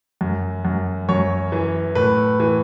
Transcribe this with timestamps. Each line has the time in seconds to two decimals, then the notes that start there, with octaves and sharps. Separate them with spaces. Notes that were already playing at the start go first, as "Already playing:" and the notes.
0.21 F#2
0.65 F#2
1.09 F#2 C#5
1.52 E3
1.95 A2 B4
2.40 E3